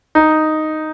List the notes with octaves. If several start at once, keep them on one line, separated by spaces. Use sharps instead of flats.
D#4